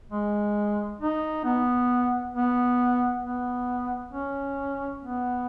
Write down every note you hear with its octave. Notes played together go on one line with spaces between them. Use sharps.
G#3
D#4
B3
B3
B3
C#4
B3